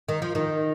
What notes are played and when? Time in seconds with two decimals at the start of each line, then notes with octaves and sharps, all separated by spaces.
0.09 D#3
0.22 F3
0.35 D#3